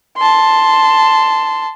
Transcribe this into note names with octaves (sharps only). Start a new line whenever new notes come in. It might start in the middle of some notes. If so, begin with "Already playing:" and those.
A5 C6